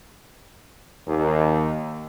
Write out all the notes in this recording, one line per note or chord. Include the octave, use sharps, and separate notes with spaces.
D#2